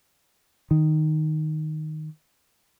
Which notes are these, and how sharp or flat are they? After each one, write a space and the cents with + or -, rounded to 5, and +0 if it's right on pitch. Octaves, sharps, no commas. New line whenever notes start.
D#3 -5